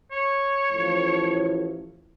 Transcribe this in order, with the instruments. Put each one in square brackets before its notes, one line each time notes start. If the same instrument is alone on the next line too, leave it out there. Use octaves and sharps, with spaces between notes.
[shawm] C#5
[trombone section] A1 A2 F3